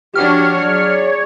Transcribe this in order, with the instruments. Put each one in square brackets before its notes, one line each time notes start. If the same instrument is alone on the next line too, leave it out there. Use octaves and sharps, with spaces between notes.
[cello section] F3 D4 F#4 [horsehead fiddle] G4 [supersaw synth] C#5 [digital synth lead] F6
[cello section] F#3 [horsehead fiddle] G#4 D5